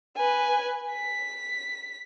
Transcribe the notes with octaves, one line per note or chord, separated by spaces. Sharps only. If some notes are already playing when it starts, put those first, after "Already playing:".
B4 G#5
B6